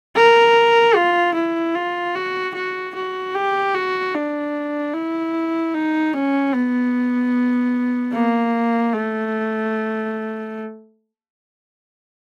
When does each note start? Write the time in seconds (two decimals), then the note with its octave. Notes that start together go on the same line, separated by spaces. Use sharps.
0.16 A#4
0.96 F4
1.35 E4
1.75 F4
2.15 F#4
2.55 F#4
2.95 F#4
3.34 G4
3.74 F#4
4.14 D4
4.93 E4
5.74 D#4
6.14 C#4
6.53 B3
8.13 A#3
8.93 A3